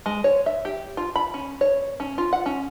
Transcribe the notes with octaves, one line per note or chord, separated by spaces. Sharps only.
G#3
C#5
E5
G4
F4
B5
C#4
C#5
C#4
F4
F#5
C#4